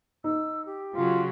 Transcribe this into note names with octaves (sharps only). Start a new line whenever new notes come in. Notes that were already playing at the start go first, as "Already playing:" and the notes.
D#4 E6
G4
C#3 F#3 F4